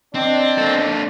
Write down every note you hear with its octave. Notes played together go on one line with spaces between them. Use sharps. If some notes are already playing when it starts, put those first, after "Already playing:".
C4 D4 D#5
A#3 A4